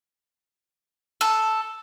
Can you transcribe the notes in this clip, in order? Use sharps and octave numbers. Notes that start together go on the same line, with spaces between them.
A4